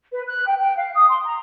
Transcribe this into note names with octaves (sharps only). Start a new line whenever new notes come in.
B4
F#6
G5
G5
F5
D#6
C6
A#5